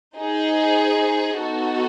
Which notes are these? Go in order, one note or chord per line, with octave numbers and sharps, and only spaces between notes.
D#4 G#4 C5
B3 D#4 F#4 A4